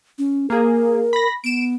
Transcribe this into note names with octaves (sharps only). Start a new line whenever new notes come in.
C#4
A#3 G#4 A#4
B5 A#6
B3 D7 E7